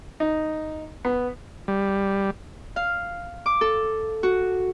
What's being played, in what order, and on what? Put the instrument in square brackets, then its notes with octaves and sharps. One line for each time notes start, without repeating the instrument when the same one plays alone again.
[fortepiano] D#4
B3
[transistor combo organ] G3
[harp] F5
D6
A4
F#4